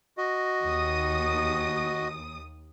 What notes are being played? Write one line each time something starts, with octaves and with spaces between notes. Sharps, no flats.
F#4 D#5
D#2 D#6